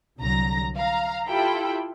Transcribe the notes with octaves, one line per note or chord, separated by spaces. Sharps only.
C2 D3 F#3 A#5 A#6
F5 A#5
E4 F4 G4 A4 G5 B5